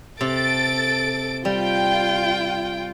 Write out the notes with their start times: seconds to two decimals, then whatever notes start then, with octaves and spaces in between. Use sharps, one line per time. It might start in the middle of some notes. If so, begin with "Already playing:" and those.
0.21 C3 A4 A6 D7
1.45 G3 F4 G5